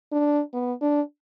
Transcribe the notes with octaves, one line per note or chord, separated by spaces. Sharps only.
D4
B3
D4